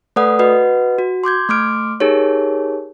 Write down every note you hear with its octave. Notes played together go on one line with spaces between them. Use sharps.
A3 A4 B4 D5 F#5 D#6
F#4 B4 D#5 F#5
F#4
C6 D6 G6 G#6
A3 C6 D6 F6 D7
D#4 G4 G#4 A#4 C#5